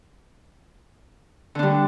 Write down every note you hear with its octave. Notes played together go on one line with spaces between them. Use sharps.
D3 G3 D4